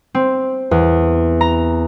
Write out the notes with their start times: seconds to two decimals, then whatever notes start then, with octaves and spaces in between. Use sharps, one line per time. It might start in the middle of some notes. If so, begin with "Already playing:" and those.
0.15 C4
0.71 E2
1.41 A#5